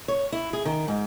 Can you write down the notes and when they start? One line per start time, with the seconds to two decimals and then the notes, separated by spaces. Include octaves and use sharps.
0.08 C#5
0.32 E4
0.53 G#4
0.65 D#3
0.88 G#2